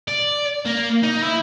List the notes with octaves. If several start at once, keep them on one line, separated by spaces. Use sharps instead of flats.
D5
A#3
D#4
E4